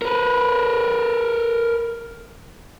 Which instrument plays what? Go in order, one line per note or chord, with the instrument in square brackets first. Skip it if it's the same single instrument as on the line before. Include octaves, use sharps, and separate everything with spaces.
[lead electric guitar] A#4 B4